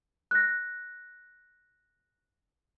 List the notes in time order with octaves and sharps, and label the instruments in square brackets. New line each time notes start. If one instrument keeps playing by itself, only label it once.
[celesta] F#6 A#6